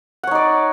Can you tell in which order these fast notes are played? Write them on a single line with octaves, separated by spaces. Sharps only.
F#5 C#5 D#4 D5